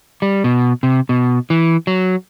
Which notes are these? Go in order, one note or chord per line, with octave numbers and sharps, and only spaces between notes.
G3
B2
C3
B2
E3
F#3